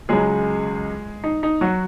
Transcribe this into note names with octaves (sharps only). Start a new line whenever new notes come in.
C#2 C#3 F#3 G#3 G#4
D#4
D#4
F#3 F#4